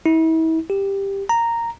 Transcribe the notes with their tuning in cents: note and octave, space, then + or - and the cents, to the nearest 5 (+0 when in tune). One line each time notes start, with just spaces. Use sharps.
E4 -40
G4 +10
A#5 -5